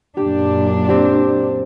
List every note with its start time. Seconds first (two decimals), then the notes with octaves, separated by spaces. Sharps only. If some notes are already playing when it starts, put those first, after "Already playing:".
0.17 F#2 A#2 D4 G4
0.88 C4 G4